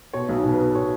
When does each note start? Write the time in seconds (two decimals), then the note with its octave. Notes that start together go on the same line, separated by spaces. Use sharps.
0.13 B2 C#5
0.29 B1
0.43 B2
0.54 B4
0.59 B2
0.75 B2 C#5